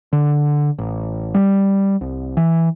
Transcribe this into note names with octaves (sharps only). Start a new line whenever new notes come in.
D3
A1
G3
C2
E3